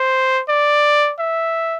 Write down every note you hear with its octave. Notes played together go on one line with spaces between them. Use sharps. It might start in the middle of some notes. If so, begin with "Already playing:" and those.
Already playing: C5
D5
E5